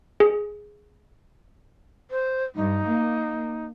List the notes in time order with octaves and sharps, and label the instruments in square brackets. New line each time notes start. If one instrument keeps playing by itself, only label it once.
[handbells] G#4
[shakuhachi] C5
[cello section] G2 [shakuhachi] D#4
[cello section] A#3